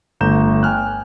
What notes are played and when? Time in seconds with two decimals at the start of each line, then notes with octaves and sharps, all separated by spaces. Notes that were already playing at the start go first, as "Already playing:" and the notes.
0.21 G1 A3 A#5 G6 E7
0.63 G5 G#5 F6 F#6